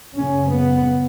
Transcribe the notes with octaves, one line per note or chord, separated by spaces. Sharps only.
F#2 C#3 C#4
B3